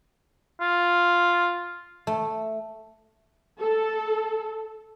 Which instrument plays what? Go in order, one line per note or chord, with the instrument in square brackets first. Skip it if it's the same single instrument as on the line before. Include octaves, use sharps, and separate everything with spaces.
[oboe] F4
[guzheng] A3
[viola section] A4